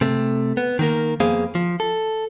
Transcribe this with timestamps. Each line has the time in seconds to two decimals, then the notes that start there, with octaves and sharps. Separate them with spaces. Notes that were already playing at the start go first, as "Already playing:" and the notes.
0.01 C3 A3
0.57 B3
0.79 D#3 A#3 A#4
1.20 F2 A#3 B3 G#4 C5 F5
1.55 F3
1.80 A4